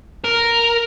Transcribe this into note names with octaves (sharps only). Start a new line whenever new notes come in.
A#4